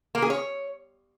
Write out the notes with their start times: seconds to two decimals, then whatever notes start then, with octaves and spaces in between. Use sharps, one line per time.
0.15 A#3
0.22 G#4
0.30 C#5